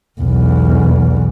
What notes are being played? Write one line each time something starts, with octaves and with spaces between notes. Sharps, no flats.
B1 E2